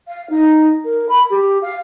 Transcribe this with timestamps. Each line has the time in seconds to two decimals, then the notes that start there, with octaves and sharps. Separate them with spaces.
0.08 F5
0.30 D#4
0.85 A#4
1.09 B5
1.30 G4
1.62 F5